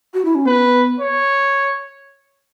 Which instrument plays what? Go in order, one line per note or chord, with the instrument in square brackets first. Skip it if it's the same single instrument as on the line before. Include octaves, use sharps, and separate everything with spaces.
[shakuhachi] F#4
E4
C#4
[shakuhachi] B3 [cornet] B4
[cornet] C#5